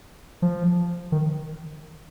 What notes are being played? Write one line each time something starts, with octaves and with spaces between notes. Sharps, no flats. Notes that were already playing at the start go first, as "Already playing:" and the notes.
F3
D#3